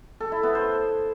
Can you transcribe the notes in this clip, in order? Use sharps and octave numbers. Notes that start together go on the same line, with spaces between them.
A4
E4
B3
C5